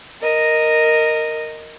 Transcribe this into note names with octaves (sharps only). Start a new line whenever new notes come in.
A#4 D#5